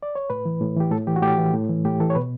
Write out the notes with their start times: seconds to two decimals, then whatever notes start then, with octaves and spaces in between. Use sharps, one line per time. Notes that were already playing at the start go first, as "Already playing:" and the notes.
0.03 D5
0.15 C#5
0.30 A2 B4
0.45 E3
0.61 A2
0.77 E3 G4
0.91 A2 A4
1.07 E3 G4
1.16 F#4
1.22 A2 G4
1.38 E3
1.54 A2
1.69 E3
1.85 A2 G4
2.00 E3 A4
2.10 C#5
2.15 B2 B4